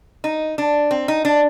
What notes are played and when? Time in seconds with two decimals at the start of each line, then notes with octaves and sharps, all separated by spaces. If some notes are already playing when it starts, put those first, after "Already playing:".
0.24 D#4
0.58 D4
0.91 C4
1.08 D#4
1.25 D4